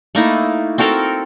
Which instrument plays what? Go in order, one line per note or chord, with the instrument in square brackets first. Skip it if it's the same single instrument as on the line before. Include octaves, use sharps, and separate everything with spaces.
[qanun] A3 A#3 D#4 E4
C4 F#4 A4 A#4